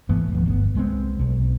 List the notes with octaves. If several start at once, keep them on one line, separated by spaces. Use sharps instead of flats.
G#2 E3 A3 B3
D1 D2 F3 B3
G1 D3 B3
C2 G#3 B3 C4
B1